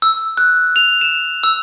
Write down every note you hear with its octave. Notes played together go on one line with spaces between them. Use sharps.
E6
F#6
F7
E7
E6